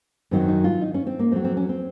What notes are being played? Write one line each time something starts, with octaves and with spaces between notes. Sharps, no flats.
F#2 D#3 F#3 C4
D#4
F4
D#4
C#4
C4
A#3
F2 D#3 F#3 C4
C4
C#4
C4